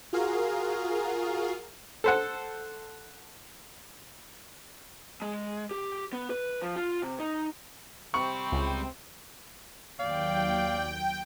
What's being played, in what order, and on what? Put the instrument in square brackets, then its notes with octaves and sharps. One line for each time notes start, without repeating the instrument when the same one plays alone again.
[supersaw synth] F4 F#4 G#4 A#4 F5
[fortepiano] A4 C5 F#5
[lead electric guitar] G#3
G4
B3
B4
F3
F4
C3
D#4
[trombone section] C3 C4 [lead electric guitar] G3 [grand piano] C#6
[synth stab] C#2
[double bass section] D#2 F#3 [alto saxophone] D5 [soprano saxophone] F5 [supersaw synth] G5